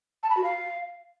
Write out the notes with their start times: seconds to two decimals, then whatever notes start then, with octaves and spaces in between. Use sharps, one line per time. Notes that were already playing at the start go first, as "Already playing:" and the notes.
0.23 A5
0.30 B5
0.37 F#4
0.44 F5